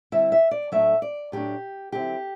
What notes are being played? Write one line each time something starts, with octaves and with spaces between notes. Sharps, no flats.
D3 G3 C4 E4 E5
E5
D5
A2 F#3 A3 D4 E5
D5
A2 F#3 A3 D4 G4
D3 F#3 C4 E4 G4